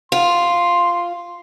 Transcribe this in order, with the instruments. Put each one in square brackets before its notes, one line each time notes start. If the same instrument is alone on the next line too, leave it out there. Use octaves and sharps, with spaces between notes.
[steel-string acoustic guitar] F4 [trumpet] C6